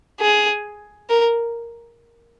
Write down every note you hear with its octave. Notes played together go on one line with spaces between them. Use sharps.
G#4
A#4